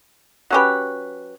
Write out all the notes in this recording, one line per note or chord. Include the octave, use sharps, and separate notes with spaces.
F#3 C#4 G4 B4